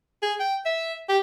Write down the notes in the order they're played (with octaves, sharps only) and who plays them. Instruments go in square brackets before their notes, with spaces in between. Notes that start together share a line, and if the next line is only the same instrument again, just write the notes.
[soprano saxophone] G#4
G5
E5
G4